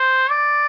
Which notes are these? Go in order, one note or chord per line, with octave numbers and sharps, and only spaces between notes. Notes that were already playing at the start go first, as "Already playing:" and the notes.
Already playing: C5
D5